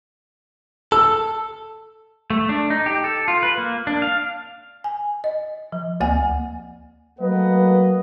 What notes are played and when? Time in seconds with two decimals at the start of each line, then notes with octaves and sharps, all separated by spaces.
0.92 A4 E6
2.30 A3
2.49 D4
2.70 D#4
2.86 G4
3.04 A4
3.28 F4
3.43 B4
3.58 A#3
3.87 D4
4.02 F5
4.84 G#5
5.24 D#5
5.72 F3
6.01 D2 A#3 F#5 G#5
7.20 F#3 A3 A#3 B4 D#5 F#5